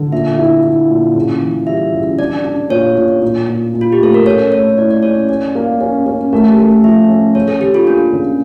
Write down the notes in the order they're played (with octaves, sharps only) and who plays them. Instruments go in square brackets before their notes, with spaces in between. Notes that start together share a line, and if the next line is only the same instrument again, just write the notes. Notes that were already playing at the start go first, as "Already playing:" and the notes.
Already playing: [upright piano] D3
[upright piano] A#2 [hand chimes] E5
[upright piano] E4
E4
A#2
C#3
E3
[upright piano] G3 [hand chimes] E5
[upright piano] C#3
[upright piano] D4 [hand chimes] D5
[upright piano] D4
[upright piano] A#2 [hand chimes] C#5
[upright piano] A#2
A#2
A#2
A#2
[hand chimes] F4
G4
[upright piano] A3 [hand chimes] A4
[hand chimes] A#4
[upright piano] C#4 [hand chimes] C#5
[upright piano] A3 [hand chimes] C#5
[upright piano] E4 [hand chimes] D5
[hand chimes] D5
[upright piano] C#4 [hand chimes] C#5
[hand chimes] D5
[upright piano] C#4 [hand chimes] D5
[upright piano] A#3
C#4
C#4
[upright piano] A3 [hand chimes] A#4
[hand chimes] G4
[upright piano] A3 [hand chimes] A4
[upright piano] F3 [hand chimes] E5
[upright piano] C#4
[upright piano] C#3 [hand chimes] C#5
[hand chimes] A4
[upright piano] C#3 [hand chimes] G4
[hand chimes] F4
[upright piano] A#3 [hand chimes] D4
[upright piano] C#3